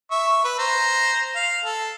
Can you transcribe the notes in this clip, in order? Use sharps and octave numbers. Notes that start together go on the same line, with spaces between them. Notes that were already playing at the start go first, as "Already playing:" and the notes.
E5 C#6
B4
C5 A#5
F5
A4